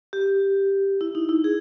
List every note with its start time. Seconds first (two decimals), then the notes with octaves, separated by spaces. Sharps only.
0.13 G4
1.01 E4
1.15 D#4
1.29 E4
1.44 G#4